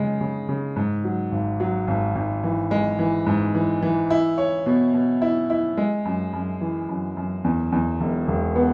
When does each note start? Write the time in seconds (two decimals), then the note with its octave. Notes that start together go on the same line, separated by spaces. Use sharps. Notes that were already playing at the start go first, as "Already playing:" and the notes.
Already playing: C#3 G#3
0.21 C#3
0.49 C#3
0.76 G#2
1.04 F#3
1.32 G#1
1.60 F#3
1.87 G#1
2.15 G#1
2.44 E3
2.71 G#3
2.99 E3
3.26 G#2
3.55 E3
3.82 E3
4.10 E4
4.38 C#5
4.66 B2
4.94 B2
5.22 E4
5.50 E4
5.77 G#3
6.05 F#2
6.33 F#2
6.61 E3
6.89 F#2
7.17 F#2
7.44 E2
7.72 E2
8.00 E1
8.28 E1
8.56 B3